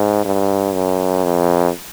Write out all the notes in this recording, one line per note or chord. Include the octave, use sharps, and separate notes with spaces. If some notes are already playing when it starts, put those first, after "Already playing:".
Already playing: G#2
G2
F#2
F2